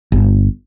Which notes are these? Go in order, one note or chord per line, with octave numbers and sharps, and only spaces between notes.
G1